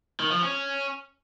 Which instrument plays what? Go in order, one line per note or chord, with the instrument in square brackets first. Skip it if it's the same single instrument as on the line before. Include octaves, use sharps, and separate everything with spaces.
[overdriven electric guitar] D#3
F3
C#4